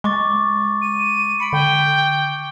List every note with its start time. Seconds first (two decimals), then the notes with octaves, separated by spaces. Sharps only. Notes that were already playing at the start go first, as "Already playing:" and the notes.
0.04 G#3 C#6 D6 A6
0.82 D#7
1.40 B5 C#7 D7
1.53 D3 G5